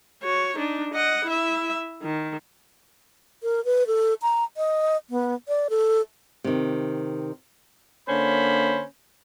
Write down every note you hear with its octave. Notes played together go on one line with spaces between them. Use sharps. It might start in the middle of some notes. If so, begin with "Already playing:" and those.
F#4 C#5
D4 D#4
D#5 F#5
E4 E5
D#3
A#4
B4
A4
A#5
D#5
B3
D5
A4
C3 D#3
D3 A#3 C#4 C5 B5